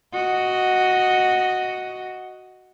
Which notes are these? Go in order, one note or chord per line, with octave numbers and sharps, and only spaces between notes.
F#4 D#5